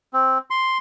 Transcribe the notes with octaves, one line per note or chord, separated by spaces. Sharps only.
C4
C6